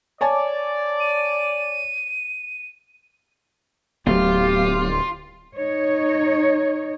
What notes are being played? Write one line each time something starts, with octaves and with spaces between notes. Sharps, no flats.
C#5 D5 G#5 A5
D#7
D1 F#3 A3 B3 F4 G4
D#4 C#5